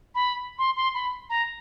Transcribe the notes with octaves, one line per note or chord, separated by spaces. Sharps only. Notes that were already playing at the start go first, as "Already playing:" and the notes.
B5
C6
C6
B5
A#5